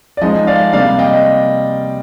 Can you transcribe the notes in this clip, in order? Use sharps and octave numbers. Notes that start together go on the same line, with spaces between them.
D5
F3 G#3 D#4 D#5
D5 F5
C3 G3 A#3 D4 D5 F5
D#5 G5